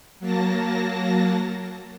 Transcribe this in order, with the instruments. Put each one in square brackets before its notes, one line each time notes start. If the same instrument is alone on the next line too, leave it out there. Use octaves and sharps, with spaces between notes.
[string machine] F#3 A#3 A5 A#6